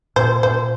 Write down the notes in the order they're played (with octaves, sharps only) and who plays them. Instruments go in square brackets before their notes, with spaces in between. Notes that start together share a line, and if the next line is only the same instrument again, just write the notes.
[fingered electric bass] A#2 [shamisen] C5
[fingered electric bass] A#2 [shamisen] C5